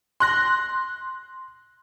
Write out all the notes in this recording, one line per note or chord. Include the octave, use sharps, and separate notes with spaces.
C6 F#6 A#6